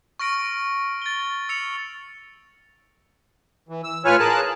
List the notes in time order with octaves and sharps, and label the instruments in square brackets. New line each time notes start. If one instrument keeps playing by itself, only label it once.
[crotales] C#6 F6 A#6 D7
A6 G7
E6 C#7 F7
[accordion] E3
E6
A2 F4 B4 C#5 G#5 F6
G#4 A#4 A5 F#6